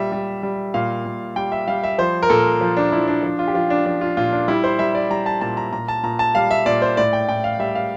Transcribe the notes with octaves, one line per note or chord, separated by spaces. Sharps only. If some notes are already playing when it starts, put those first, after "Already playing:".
Already playing: A#2 G3 E5
G3
G3
A#2 F5
A#2
G3 G5
E5
G3 F5
E5
F3 C5
A#4
A#2 A4
F3
D4
F3 E4
D4
F3 D4
F4
G4
F3 F4
D4
F3 D4
F4
A#2 F4
D4
G3 E4
C5
G3 E5
D5
G3 A#5
A5
A#2 A5
A#5
A#2 A#5
A5
A#2 A#5
A5
G3 F5
E5
A#2 D5
C5
A2 D5
G5
A2 G5
F5
G3 E5
F5